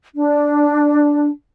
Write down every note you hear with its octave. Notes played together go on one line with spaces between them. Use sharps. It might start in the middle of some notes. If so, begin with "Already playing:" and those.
D4